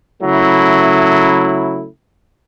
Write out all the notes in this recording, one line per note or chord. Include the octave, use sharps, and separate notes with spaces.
C#3 F#3 A3 E4